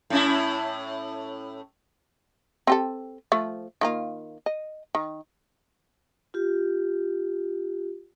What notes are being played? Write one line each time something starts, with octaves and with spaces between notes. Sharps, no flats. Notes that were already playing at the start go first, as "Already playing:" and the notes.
A2 C#4 E4
C4 G4 A4
F3 A3
D#3 A#3 F4
D#5
D#3
F4 G4